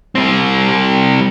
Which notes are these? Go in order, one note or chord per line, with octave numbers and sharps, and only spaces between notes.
G3 C4